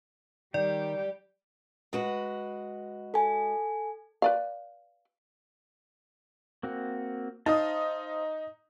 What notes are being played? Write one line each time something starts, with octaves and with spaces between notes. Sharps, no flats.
D#3 G3 G4 D5
G#3 F#4 B4
A4 G#5
B4 D5 F5
A#3 C4 F#4
D#4 C5 F5 A5 D#6